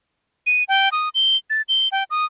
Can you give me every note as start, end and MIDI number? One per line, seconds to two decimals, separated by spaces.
0.46 0.64 99
0.69 0.89 79
0.92 1.09 87
1.15 1.37 103
1.50 1.62 93
1.69 1.88 103
1.92 2.04 79
2.10 2.25 87